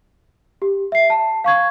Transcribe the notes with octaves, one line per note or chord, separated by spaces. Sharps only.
G4
E5 C7
A5
F5 C#6 G#6